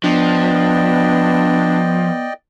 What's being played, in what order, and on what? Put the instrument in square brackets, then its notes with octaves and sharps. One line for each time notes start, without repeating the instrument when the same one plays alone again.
[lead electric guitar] F3 [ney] B3 [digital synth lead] D4 [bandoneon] D5 D#5 G5